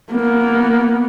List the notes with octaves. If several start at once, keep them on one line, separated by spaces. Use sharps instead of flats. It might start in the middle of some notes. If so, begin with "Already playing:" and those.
A#3 B3